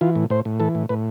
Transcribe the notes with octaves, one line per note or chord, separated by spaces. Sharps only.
E3 F4
A2
A2 C5
A2
E3 A4
A2
A2 B4